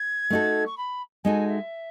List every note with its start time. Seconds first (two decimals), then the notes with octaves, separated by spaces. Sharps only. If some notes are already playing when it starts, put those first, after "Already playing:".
Already playing: G#6
0.30 A3 D#4 F#4 A4
0.66 C#6
0.78 B5
1.24 G#3 D#4 F#4 A4 G#5
1.48 E5